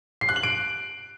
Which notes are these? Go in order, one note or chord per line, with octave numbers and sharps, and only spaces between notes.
C7
F#6
F#7
D7